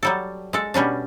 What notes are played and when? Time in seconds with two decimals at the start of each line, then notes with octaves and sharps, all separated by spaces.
0.03 F#3 G3 A4
0.53 G#3 A4
0.74 B2 G3 C#4 D4